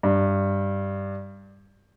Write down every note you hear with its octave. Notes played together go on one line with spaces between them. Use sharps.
G2